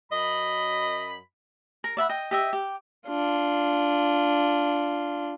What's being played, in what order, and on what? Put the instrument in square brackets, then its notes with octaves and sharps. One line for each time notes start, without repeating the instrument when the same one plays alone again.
[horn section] F#2 B5 [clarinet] D#5
[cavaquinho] A#4
D5 E5 F#5 B5
D#5 G5
G4 D#5 E5
G4
[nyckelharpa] D4 F4